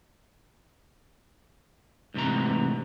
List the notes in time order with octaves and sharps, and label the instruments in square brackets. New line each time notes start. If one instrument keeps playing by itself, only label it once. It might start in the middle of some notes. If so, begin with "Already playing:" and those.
[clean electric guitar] D2 G#2 C3 E3 A#5